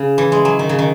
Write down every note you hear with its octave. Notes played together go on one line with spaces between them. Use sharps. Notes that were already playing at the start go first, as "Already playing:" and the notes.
Already playing: C#3
E3
G#3
F#3
D#3
C#3
D#3